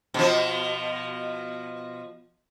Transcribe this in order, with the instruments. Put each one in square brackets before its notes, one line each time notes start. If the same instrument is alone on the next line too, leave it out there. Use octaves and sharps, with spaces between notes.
[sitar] B2 F3